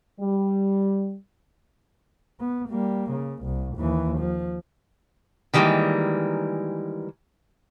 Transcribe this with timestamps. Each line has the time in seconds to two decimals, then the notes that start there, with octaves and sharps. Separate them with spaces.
0.19 G3
2.40 B3
2.69 G3 A#3
3.11 C#3
3.44 C2
3.77 D#2 E3
4.19 F3
5.53 D#3 E3 G3 G#3 A#3